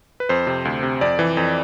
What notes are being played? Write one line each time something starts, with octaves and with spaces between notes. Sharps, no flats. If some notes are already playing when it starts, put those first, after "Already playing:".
B4
F2 C5
C3
D2
C3
F2 D5
E3
F2